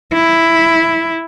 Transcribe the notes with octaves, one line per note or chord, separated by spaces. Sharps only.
E4